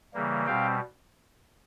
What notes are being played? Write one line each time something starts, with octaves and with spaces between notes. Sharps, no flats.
C#3 E3 G3 A#3
B2 G3 C4 F5 G5